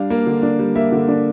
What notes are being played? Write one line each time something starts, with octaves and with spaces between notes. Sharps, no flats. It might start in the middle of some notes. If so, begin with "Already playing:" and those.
Already playing: G3 D4 F5
A#3
D3
D4
G3
A#3 E5
D3
D4